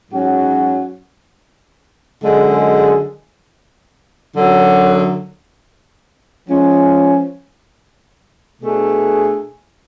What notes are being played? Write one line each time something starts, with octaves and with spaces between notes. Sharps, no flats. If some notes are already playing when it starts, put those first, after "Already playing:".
G#2 F#3 C#4 F#4
F#2 D3 G#3
F#2 D3 F#3
F3 G#3 C#4
B2 A3 D4 G#4